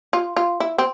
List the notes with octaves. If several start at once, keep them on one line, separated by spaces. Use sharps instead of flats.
F4
F4
E4
C4